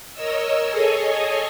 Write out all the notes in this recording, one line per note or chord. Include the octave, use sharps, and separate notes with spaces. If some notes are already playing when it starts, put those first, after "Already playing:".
A#4 C#5 D#5 E6
G#4 A4 C#5 D#5 G#5